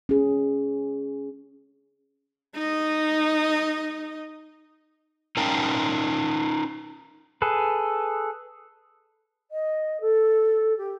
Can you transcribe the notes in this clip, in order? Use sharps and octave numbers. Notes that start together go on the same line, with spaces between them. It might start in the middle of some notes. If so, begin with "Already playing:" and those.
C#4 G#4
D#4 D#5
C#4 D#4 A#4 F5 G5 A5
G#4 A4 B4
D#5
A4
G4